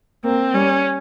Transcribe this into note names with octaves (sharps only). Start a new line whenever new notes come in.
A#3 C4
G3 C#4